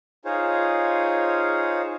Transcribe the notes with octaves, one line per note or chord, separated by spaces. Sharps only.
D#4 F4 G#4 C5 C#5